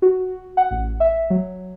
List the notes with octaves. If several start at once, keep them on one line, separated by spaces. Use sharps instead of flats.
F#4
F#5
A1
E5
F#3